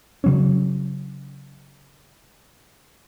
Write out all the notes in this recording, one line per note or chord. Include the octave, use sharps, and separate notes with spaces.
C#3 F#3 C#4